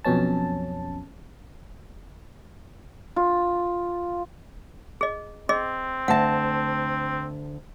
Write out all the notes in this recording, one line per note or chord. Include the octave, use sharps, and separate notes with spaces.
B1 F2 B2 C#4 A5
F4
G#4 D#5
C4 G#4 D#5
D2 E5 F#5 A5